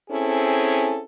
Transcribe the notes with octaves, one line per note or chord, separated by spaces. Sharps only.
C4 C#4 E4 G#4 A4